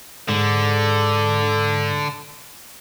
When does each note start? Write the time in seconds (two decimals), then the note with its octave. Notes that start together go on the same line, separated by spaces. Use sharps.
0.29 G#2 D3 A4